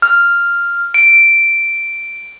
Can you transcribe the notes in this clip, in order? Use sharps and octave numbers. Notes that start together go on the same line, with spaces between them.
F6
D7